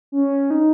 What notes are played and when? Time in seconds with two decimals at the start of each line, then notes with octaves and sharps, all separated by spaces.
0.12 C#4
0.50 D#4